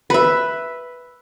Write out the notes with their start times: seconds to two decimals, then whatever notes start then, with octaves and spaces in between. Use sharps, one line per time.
0.10 B4 E5